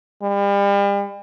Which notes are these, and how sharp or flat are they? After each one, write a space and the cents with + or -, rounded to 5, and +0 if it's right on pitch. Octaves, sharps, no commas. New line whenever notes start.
G3 +40